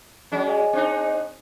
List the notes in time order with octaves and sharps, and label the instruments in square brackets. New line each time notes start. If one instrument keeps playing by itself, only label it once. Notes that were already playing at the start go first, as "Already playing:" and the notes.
[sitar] F#3 G#3 C#4 [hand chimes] D5
[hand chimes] G#4 D#5 G#5
[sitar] C4 D4 D#4